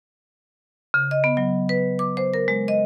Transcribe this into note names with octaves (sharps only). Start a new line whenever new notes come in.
C#3
D#5
B3
F#3
B4
D6
C5
A#4
G#3
D#5